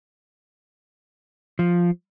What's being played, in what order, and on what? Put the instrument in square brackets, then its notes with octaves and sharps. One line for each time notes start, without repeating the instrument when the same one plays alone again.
[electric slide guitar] F3